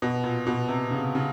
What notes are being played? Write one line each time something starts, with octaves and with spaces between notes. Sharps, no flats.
B2
A#2
B2
C3
C#3
C#3